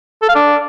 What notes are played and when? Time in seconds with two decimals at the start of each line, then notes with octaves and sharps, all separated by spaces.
0.22 A4
0.29 F5
0.35 D4